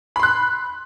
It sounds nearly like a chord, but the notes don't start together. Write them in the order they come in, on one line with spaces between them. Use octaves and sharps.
B5 C6 F#6